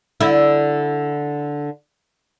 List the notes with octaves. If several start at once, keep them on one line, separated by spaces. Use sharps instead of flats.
D3 E4